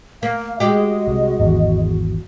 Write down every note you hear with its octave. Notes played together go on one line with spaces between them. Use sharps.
A#3 F5
G#3 F#4 G4 D#5
C2
G#1 E2